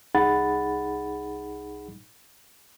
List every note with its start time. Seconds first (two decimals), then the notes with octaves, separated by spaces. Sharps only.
0.15 C2 D#4 G#4 F#5 B5 A6